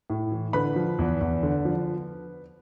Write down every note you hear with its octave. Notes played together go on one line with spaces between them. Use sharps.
A2
E3
D3 B4 B5
F3
E2
E2
D3
F3